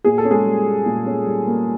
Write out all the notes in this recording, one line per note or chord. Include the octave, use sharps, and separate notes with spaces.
A#2 G#4
A4
C#4
G#3 G#4
G3
A#3
A#2
C#4
G3
A#3